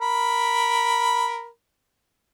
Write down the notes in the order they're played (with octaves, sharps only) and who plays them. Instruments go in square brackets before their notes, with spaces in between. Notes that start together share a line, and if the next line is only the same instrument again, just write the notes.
[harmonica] A#4 B5